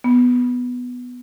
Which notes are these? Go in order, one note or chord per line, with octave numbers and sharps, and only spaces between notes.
B3